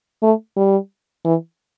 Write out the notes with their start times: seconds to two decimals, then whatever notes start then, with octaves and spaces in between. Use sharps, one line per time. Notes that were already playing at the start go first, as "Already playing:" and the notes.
0.23 A3
0.57 G3
1.25 E3